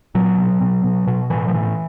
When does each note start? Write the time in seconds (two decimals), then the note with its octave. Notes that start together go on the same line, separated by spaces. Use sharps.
0.15 A#2 F#3
0.38 B2
0.61 B2
0.84 B2
1.07 B2
1.30 A2 E3
1.48 F3
1.54 A2 E3